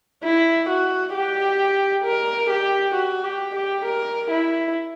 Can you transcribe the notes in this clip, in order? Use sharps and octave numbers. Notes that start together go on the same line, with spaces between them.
E4
F#4
G4
A#4
G4
F#4
G4
G4
A#4
E4